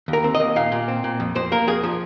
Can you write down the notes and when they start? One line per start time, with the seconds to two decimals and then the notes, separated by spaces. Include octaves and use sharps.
0.08 D#2
0.13 A#4
0.24 C4
0.35 D#5
0.40 D#2
0.56 A#2 F5
0.72 A#2
0.88 C4
1.04 A#2
1.20 F2
1.35 F2 C5
1.52 A#3 A#4
1.67 F2 G#4
1.83 F3